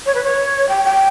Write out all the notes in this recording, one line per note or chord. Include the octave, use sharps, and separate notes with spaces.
C#5
B4
C#5
G5
G5